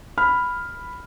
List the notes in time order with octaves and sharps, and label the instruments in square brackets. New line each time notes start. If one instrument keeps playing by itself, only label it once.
[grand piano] B5 [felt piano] F6